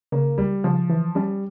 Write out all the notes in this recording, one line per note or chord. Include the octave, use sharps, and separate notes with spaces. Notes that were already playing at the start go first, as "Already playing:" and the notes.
C#3 A#3
C#2 G3
C#3 F3
E3
G3 C#4